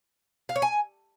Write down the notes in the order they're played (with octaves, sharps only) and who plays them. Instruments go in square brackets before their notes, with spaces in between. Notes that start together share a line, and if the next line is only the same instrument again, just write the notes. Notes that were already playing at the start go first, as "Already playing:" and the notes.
[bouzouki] F5
C#5
G#5